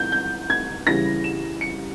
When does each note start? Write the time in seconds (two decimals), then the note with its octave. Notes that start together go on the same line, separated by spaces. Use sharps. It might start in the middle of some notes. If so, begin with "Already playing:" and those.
Already playing: E3 E4 G6
0.12 G6
0.50 G#6
0.87 C#3 E3 G3 C#4 E4 A#6
1.24 E7
1.61 C#7